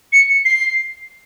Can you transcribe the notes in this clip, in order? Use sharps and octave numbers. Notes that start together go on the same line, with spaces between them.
C#7
C7